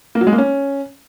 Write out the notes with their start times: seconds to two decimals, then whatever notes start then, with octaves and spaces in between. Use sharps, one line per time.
0.15 A#3
0.21 F#3
0.27 G#3
0.32 A#3
0.38 C#4